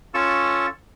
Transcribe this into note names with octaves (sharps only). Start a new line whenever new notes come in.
C#4 F4 A4 C#6 E6